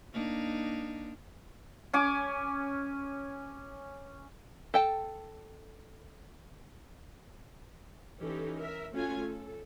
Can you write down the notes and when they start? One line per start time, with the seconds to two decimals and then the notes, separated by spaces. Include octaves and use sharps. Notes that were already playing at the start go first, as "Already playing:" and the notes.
0.14 A#3 D4 D#4
1.93 C#4 G#5 D6
4.74 A4 G5 A5
8.20 E3 C#4 D#4 G4 A4
8.59 A#4 E5
8.93 A3 C#4 F4 F#4 G#5
9.25 A4